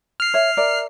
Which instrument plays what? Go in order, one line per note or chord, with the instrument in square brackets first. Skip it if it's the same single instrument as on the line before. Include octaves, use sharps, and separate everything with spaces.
[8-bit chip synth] F6 C7
[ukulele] C#5 E5
A#4 D5 E5